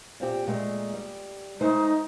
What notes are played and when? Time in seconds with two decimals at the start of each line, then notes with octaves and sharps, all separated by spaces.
0.20 A#2 C4 G4
0.47 A#2 G#3 A3
0.94 G3
1.61 G#3 A3 D#4 C5